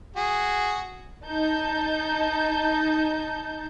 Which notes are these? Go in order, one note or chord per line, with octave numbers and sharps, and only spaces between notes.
F#4 G#4
D#4 A5 G6